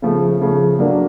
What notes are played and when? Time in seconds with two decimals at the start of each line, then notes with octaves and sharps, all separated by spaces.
0.02 C#3 F3 A3
0.41 C#3 F3 A3
0.79 F#3 A#3 D4